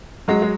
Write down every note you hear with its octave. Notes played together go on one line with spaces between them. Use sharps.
F#3 G#3
G#3